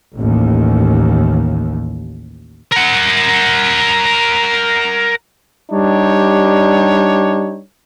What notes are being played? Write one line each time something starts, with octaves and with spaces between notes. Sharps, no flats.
A1 D#2
A#4 F#5
G3 D4 D#4 G4 C#5